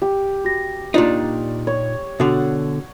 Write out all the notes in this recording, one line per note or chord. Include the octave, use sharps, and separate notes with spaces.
G4
F#4 A#6
A#2 D4 D#4 F4 D5 C#6
C#5
B2 D3 F#4 F#5